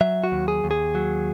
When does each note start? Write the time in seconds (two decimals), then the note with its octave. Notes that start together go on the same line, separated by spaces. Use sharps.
0.01 F#3 E5
0.24 F#4
0.32 D#2
0.48 G#4
0.64 D#2
0.71 G#4
0.95 F#3